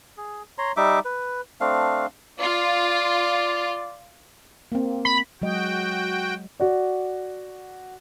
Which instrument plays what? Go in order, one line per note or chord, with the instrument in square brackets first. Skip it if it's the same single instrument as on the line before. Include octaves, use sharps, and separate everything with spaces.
[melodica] G#4
C#5 A#5 C6
G3 D#4 E5 D6
B4
A3 C4 D4 F5
[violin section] F4 [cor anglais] D5
[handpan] A#3 C4
[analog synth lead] B5
[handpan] F#3 G#3 D#5 [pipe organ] F#4 G5
[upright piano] F#4 D5